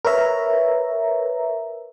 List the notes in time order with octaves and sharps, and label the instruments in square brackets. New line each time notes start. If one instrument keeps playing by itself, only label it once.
[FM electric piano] A#4 B4 C#5 E5 A#5